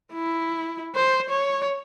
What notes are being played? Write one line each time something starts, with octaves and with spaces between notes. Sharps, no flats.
E4
C5
C#5